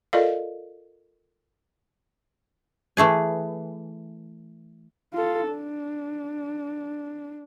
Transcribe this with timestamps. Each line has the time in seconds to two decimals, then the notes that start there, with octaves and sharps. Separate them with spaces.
0.13 F4 A4 A#4 D5 D#5 F5
2.97 E3 A3 G#4 G#5
5.14 F4 A4
5.51 D4